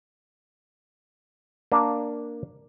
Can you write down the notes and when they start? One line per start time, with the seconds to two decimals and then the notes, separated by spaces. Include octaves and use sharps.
1.72 A#3 D4